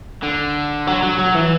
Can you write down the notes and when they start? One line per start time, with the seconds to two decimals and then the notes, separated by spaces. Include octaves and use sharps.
0.23 D3
0.87 F#3
1.03 F#3
1.19 F#3
1.35 E3